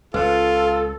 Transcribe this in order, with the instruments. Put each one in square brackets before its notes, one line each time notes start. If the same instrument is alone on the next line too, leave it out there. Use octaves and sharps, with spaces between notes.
[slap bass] C#2 C#3 [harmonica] F4 [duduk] A4 [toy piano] B4 C5